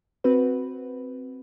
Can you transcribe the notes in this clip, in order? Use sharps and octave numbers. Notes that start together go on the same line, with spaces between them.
C4 F#4 B4